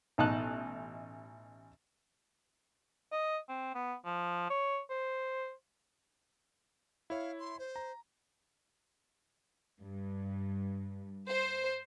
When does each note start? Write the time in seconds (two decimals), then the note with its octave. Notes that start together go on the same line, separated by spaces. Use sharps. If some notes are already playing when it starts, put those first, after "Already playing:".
0.18 A1 B2 D#4 D#5 A5 F#6
3.12 D#5
3.49 C4
3.75 B3
4.05 F3
4.50 C#5
4.90 C5
7.10 E4 C#5 F5
7.40 C6
7.59 C5
7.76 A#5
9.82 G2
11.30 C5